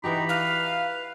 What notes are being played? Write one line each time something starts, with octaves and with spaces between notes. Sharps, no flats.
E3 D#4 F#4 G4 A#5 B5
B4 F5